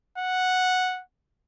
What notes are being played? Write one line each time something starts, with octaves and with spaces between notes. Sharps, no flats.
F#5